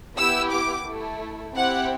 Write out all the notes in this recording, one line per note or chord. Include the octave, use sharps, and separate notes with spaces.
B3 E4 G4 E6
D6
A3 E4 A4
C4 E4 G4 F#5